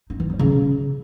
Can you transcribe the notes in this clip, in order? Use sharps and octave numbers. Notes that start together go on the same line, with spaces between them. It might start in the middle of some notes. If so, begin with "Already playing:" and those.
D#4
E3
B3
C#3